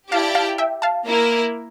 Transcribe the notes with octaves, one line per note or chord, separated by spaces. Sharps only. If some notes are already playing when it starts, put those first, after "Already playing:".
E4 G4 D5 F5 G5 A5
F5 A5
E5 G5
F5 A5
A#3 E4 A#4